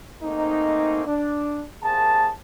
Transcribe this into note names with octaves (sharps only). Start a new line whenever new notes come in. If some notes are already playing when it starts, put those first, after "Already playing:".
G#2 A3 A#3 C4 D#4
D4
C2 A#3 G#4 C5 A5